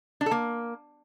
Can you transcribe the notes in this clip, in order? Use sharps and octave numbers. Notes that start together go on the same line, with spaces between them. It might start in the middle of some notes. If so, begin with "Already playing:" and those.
D4
A4
A#3